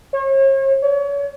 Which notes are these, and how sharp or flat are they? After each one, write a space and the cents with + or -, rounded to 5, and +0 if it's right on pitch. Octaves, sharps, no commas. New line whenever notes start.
C#5 -40
C#5 +35